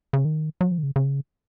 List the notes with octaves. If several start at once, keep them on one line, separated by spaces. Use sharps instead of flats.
C#3
D#3
F#3
F3
D#3
C#3
C#3